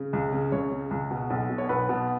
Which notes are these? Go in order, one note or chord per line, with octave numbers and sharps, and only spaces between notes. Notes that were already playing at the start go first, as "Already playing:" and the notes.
Already playing: C#3
C#2
C#3
C#2 C#5
C#3
C#2
B2
B1
B2
C#5
B1 B4
B2